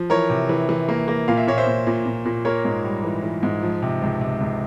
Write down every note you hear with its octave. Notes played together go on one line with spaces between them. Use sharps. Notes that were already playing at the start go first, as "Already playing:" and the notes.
Already playing: F3
E3 A#4 C#5
C3
E3
E3
A#3
A#3
A#2 F5
E5
A#2 C#5
C5 E5
A#2
A#2
A#2
A#2
A#3 A#4 C#5
G#2
G3
E3
E3
G#2
F3
C3
C#2
C3
C#2